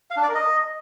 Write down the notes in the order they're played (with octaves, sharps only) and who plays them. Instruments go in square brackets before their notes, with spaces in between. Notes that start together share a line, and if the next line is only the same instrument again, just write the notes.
[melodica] F5
D4
D5
A#4
D#5